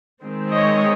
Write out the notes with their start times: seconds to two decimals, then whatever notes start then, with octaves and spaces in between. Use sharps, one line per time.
0.24 D#3 G#3 C4
0.53 C#5 D#5